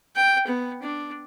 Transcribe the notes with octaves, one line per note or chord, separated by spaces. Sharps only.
G5
B3
D4